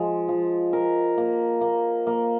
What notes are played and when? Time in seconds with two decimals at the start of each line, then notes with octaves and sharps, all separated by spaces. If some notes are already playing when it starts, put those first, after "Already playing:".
Already playing: F3 G#3
0.28 F3
0.73 A#4
1.18 A#3
1.61 A#3
2.07 A#3